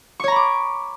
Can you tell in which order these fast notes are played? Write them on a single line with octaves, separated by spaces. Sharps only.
C#6 C#5 A#5 B5 D6